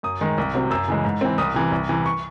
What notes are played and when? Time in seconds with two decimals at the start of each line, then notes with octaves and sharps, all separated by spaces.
0.03 F#2 D#6
0.21 D#3 G#3
0.38 C2
0.54 C3 F#3 C4
0.70 F#2 E6
0.88 C#3 E3 G#3
1.04 G#2
1.21 E3 C4
1.38 C2 D#6
1.54 C3 E3
1.72 C2
1.89 C3 E3
2.06 C#6